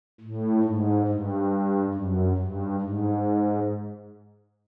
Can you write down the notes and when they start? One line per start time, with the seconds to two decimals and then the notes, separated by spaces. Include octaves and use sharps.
0.20 A2
0.63 G#2
1.07 G2
1.94 F#2
2.37 G2
2.81 G#2